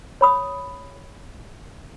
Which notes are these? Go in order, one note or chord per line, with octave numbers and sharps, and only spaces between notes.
C#5 B5 D#6